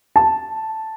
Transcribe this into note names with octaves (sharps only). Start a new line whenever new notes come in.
A5